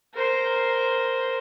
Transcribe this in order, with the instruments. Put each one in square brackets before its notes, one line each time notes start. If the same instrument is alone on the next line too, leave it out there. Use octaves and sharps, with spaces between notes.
[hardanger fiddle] A#4 C5